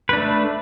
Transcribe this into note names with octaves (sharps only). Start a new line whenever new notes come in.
A3 D4 B4